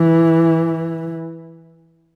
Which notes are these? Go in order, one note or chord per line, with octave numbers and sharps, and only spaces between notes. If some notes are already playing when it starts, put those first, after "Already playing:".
Already playing: E3